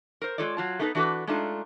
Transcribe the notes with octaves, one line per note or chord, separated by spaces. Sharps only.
A#4 C5
G#3 A#3 F4 A4 C#5 D5
F#3 F4 A5
A3 B3 D#4 G4 A4 B4
E3 D4 F#4 A4 B4
G#3 A3 D4 D#4 F4 A4